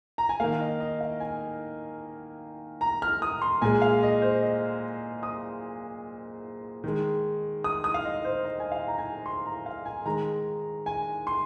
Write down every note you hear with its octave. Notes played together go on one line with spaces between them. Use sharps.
A#5
G#5
D#3 A#3 F5
D#5
D#5
F5
G#5
A#5
F6
D#6
C6
A#2 G#3 G#5
F5
D#5
C5
D#5
D#6
D#3 G#3
D#6
D#6
F5
D#5
C5
D#5
G#5
F5
A#5
G#5
C6
A#5
F5
G#5
D#3 G#3 A#5
G#5
C6